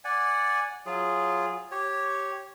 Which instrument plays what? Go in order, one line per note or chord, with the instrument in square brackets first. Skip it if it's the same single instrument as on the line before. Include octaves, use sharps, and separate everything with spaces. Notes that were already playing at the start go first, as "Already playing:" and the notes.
[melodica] D5 F#5 G#5
F#3 F4 G#4
G4 C#5